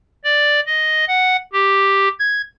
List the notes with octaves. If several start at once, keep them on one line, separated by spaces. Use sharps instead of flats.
D5
D#5
F#5
G4
G#6